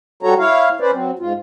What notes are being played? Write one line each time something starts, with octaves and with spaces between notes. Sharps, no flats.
G3 F#4 A4 C#5 A#5
E4 C#5 F5
C#4 B4 C5 D5
F#3 C4
G#2 F4